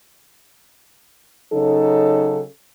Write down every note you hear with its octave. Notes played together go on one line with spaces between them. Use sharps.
C#3 F#3 D#4 A4